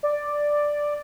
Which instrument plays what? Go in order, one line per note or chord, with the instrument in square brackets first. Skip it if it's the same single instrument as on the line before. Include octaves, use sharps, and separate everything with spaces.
[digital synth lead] D5